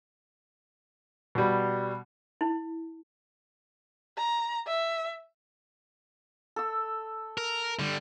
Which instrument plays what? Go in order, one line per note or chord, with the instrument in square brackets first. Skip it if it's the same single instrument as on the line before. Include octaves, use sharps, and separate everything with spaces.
[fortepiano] B2 G3
[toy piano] E4
[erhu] A#5
E5
[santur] A4 E6
[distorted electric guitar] A#4
D3 G3